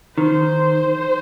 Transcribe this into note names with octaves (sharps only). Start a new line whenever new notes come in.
D#3 C5